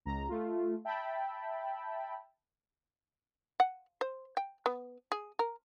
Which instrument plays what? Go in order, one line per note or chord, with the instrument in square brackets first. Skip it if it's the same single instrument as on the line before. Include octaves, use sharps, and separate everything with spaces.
[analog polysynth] C#2 A#5
A3 F4
E5 G5 A5 B5
[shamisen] F#5
C5
G5
B3
G#4
A#4